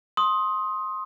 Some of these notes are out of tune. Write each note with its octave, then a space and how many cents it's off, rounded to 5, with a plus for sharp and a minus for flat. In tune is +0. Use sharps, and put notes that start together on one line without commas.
C6 +15 D#6 +15